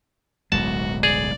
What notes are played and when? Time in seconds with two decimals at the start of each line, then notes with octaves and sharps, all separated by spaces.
0.52 D1 B1 G#3 F#4 A5
1.03 G#4 D5